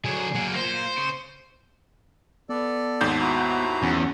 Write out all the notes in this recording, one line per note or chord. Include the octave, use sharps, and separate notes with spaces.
D3 F#3 G#4
F#3 A#3
A#3 F4 C5
C#3
B3 A4 D5
D#2 G#2 G6
E4 F#4 A#5
E2 C#4